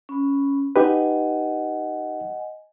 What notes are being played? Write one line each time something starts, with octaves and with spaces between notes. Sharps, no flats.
C#4 B5
D#4 G4 B4 D#5 F#5 G#5